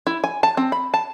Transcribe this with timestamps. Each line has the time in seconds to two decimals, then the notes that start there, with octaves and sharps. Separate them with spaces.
0.07 E4
0.24 G#5
0.43 A5
0.57 C4
0.72 B5
0.94 A5